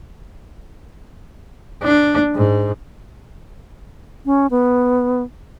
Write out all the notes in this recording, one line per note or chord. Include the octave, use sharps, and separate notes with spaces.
D4
G#2
C#4
B3